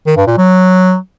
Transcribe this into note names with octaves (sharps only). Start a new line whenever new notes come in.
D#3
G2
A#2
F#3